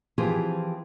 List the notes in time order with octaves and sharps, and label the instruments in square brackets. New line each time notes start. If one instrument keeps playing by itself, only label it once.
[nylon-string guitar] E3 F3 C4 F4 G4 G#4